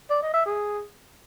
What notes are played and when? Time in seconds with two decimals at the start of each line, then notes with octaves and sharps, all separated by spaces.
0.10 D5
0.22 D#5
0.34 E5
0.46 G#4